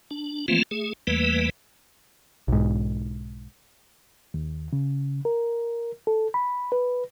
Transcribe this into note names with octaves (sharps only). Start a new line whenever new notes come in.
D4
E3 F3 A3 A#3 C4 F4
A3 G#4
E2 E3 G3 A3 A#3 B4
B1 G#2
D#2
C#3
A#4
A4
B5
B4